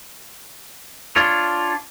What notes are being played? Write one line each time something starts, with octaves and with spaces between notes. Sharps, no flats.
D4 F4 C#5